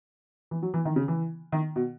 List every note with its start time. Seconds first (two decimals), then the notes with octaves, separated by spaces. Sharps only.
0.51 E3
0.63 F#3
0.74 E3
0.85 D#3
0.96 C#3
1.08 E3
1.52 D#3
1.76 B2